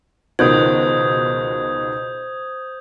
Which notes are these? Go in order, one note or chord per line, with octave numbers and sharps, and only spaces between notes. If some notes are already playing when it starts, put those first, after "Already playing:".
C#2 B2 D#3 F#4 C5 D#6 G6 G#6